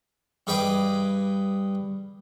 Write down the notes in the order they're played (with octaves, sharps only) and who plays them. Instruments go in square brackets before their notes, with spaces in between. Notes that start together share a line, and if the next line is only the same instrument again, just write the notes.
[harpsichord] G2 G#4 B4 D#5 G5 D6